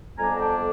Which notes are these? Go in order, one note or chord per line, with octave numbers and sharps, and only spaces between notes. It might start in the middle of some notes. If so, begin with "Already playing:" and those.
F2 D3 G3 B3 D4 G#5 A#5
G5 A5